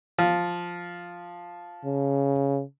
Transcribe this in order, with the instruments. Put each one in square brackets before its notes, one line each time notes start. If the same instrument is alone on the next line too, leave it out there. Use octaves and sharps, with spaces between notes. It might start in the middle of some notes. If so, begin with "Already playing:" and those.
[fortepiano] F3
[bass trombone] C#3